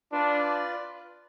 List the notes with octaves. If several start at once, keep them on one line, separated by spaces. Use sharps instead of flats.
D4 F4 B4 D5